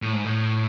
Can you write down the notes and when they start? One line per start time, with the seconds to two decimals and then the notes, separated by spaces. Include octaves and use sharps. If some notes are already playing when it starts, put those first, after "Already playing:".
0.02 A2
0.13 G#2
0.25 A2